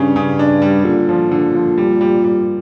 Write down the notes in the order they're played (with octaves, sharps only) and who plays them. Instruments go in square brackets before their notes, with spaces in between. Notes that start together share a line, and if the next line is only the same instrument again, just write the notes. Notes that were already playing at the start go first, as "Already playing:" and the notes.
Already playing: [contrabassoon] G2 [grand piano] C#3 C#4
[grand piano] C#3
D4
G3
[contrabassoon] A#2 [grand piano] D3
[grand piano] F3
D3
F3
G3
G3
G3